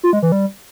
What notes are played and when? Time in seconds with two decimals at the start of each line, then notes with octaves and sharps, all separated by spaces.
0.03 F4
0.13 G#3
0.22 E3
0.32 G3